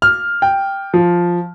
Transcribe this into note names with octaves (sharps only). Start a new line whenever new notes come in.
F6
G5
F3